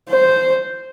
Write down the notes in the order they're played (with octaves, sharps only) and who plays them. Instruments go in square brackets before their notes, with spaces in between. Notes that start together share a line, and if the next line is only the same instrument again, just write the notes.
[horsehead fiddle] C5